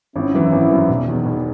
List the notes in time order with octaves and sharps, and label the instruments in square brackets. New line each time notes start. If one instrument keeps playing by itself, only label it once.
[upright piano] G#1 [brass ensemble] C#4 E4
[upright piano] F#2 E3
G#1
F#2 E3
E1
E2 D#3
E1